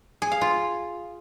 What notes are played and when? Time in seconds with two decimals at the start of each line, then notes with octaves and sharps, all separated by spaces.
0.22 G#4
0.32 F5
0.41 F4